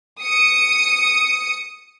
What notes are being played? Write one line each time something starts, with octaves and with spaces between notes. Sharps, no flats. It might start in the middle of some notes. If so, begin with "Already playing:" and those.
D#6 C#7